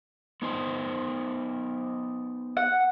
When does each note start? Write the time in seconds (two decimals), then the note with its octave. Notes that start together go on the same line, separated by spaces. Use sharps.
0.42 B3 D#4 C5
2.57 F#5